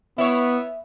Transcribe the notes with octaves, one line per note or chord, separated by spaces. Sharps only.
B3 E4 C#5 E5